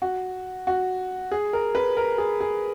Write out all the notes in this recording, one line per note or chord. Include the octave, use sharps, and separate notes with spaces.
F#4
F#4
G#4
A#4
B4
A#4
G#4
G#4